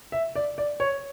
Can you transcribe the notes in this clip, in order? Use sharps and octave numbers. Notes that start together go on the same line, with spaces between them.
E5
D5
D5
C#5